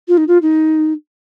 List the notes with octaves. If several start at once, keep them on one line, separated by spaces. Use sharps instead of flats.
F4
D#4
F4
D#4